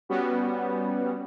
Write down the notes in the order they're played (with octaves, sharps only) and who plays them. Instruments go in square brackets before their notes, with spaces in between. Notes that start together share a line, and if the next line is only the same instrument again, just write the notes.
[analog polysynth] G3 B3 C#4 F#4